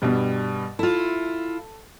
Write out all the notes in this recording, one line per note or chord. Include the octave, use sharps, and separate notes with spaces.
G2 B2 G3
E4 F4 A4